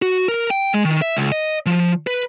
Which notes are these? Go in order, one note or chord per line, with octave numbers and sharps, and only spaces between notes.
F#4
A#4
G5
G#3
D#3
E5
C#2
D#5
F3
B4